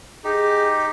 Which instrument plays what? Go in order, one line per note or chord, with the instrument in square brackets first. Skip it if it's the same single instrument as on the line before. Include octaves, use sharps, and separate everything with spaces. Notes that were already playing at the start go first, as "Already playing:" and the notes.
[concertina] D#4 G4 [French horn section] G#4